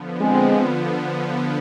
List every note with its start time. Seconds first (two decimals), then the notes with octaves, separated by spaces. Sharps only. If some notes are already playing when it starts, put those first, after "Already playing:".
Already playing: D3 F3 B3
0.21 G#3 C4